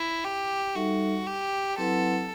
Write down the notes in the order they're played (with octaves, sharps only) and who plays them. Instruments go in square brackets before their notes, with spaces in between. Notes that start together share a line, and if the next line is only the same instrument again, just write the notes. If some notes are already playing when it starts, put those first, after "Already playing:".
Already playing: [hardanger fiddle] E4
G4
[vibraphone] G3 D#4 A4 E5 [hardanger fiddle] F#4
[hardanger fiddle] G4
[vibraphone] F#3 C4 E4 B4 F#5 [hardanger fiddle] A4